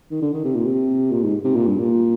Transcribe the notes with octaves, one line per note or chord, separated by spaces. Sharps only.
D#3
D3
D#3
C3
A#2
C3
A#2
G#2
C3
A#2
G2
A#2